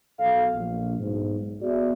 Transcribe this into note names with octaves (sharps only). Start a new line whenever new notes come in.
B1 A4 F5
A#1
B1 G#2
B3 F#4 G#4 D5 E5